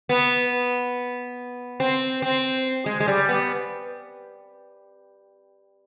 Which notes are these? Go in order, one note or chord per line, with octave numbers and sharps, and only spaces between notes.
B3
C4
C4
G#3
G#3
G3
B3